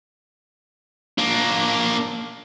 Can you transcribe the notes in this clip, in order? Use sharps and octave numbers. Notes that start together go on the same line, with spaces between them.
A#3 D4